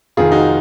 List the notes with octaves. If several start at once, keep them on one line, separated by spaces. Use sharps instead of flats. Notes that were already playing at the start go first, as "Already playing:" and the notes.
F1 F2 D#3 F4 G#4
D#4 F#4